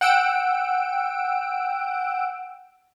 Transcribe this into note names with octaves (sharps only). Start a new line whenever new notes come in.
F#5 G5 E6 D7